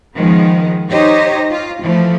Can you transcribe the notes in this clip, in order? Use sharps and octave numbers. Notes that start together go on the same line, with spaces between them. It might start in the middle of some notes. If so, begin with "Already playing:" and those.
D#3 F3 G#3 B3
D#4 G4 C5 C#5 D#5
F4
E3 F3 A3